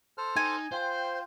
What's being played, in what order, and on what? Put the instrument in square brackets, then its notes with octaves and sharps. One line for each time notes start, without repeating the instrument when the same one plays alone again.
[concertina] A4 C5 F6
[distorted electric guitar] D#4 [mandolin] G#5
[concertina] F4 [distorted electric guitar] C5 [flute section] G5 G6